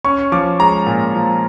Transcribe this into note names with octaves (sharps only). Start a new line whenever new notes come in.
C#4 C#6
F3 D6
G#3 A#5
A#2
F3